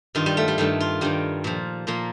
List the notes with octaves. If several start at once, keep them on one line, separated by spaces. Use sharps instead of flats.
G2 D#3 F4
G3
A3
G3
G2 D#3 A3
F4
G2 D#3 G3
A#2 F3
A#2 F3 A#3